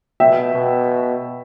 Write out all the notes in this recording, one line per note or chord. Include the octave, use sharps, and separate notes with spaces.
B2 E5 G5
B2